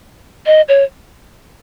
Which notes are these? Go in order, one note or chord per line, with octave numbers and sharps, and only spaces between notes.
D#5
C#5